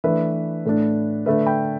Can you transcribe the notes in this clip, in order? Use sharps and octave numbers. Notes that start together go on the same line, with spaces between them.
E3 A3 D4 B4 E5
A2 A3 D4
D3 A3 D4 B4 E5
G5 B5